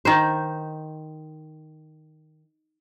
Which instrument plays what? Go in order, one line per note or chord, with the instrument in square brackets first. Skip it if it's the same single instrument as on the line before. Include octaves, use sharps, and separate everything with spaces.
[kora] D#3 C5